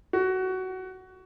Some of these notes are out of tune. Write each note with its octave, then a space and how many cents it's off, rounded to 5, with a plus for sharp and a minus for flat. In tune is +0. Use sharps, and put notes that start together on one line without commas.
F#4 +15